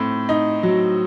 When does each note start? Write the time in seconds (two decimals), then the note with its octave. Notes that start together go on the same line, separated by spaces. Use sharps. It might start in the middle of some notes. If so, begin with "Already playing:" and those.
Already playing: A2 C4
0.29 D#4
0.63 F#3